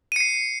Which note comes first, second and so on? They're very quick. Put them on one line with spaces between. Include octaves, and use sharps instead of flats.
D#7 C#7 C7